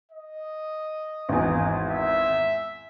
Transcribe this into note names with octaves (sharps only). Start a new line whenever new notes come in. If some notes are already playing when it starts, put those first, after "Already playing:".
D#5
G#1 E2
E5